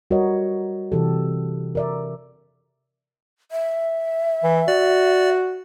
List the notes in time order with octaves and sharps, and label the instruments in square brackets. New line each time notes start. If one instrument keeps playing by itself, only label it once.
[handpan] G3 F#4 A#4 B4 C#5 D#5
C3 E3 G4 A4
A#4 D5 E5
[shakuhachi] E5
[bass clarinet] E3
[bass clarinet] F#4 [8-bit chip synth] D5